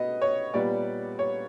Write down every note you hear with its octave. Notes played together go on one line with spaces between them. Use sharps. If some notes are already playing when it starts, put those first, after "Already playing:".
Already playing: B2 B3 D#5
C#5
A#2 G3 B3 D5
C#5